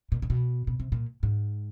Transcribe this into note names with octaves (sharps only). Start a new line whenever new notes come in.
A#2
A#2
B2
B2
C3
A#2
G#2